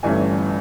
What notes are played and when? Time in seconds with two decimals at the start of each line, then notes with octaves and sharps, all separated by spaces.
0.03 G1 G2 E3 A3 C#4 G#5